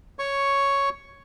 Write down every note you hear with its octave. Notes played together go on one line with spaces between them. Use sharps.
C#5 C#6